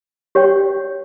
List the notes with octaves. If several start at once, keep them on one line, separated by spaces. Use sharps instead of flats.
G4 C#5 G5